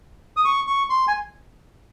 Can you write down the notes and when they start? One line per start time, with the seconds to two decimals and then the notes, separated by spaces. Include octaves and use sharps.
0.37 D#6
0.45 C#6
0.67 C#6
0.90 C6
1.08 G#5